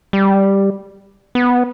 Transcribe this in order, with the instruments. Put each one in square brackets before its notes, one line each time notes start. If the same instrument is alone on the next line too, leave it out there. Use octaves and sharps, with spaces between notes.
[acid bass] G3
B3